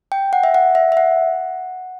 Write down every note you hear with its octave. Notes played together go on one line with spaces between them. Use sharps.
G5
F#5
E5
F#5
E5
E5
F#5